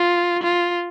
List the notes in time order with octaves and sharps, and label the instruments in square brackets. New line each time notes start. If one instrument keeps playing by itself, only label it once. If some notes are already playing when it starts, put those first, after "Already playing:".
Already playing: [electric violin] F4
F4